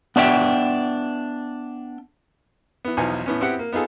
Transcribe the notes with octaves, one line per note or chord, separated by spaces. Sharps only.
B3 D4 E5 G5
E3 B3
B1 E2 F3 B3 D#4 G#5
A2 B3 C#4
B3 C4 E4 G4 F#5
A#3
B3 D#4 F4 G#4 A4